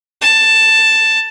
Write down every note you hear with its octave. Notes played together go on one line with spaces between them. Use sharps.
A5